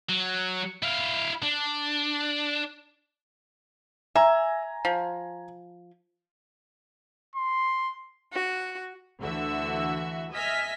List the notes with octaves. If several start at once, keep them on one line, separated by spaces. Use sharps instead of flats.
F#3
E4 F5
D4
E5 G#5 A#5
F3
C6
F#4
D2 D3 E3 F#4 E5 E6
D#5 E5 G#5 F6 A#6 B6